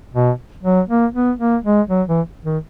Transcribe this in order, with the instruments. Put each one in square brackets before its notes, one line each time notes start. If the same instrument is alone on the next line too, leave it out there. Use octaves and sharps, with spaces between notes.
[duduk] B2
F#3
A#3
B3
A#3
G#3
F#3
E3
D#3